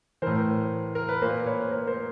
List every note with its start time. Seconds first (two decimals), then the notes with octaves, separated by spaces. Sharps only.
0.22 A2 E3 A#4 C5
0.95 A#4
1.09 B4
1.22 A#2 A#4 C5
1.46 B4 C#5
1.71 A#4 C5
1.87 A#4 C5